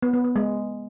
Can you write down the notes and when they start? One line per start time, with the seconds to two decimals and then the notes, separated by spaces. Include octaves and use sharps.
0.03 B3
0.14 B3
0.25 B3
0.36 G#3